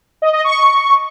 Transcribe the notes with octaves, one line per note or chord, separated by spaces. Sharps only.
D#5
D#5
C#6